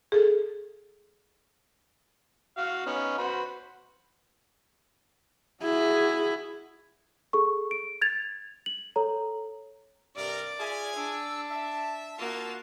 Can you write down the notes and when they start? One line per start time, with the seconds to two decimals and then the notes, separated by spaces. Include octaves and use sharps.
0.12 G#4 A4
2.57 F#4 F5
2.86 B3 C#4 D#4
3.18 F#4 B4 C5
5.62 E4 F#4 G#4
7.33 G#4 A4 C#6
7.71 D7
8.02 G#6 A6 F7
8.66 F#7
8.96 A4 C#5 A#5
10.16 G2 C3 A#4 D5
10.59 F4 G#4 E5 G#5
10.96 D4 E6
11.50 E5 A5
12.19 A#3 F4 F#4 E5 A5